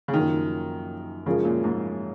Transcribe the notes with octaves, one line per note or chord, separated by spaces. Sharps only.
C#3
F#2 D#3 F3 A#3
F#2 C#3 F3 G#3 C#4 F4
A#2
G#2